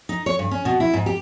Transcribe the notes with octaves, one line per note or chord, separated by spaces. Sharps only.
D#4
C#5
G2
C#4
B2
E4
G#2
G4